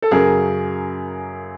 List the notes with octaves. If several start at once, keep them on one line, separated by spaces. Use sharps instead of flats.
A4
F#2 C#3 F#3 G#4 A#4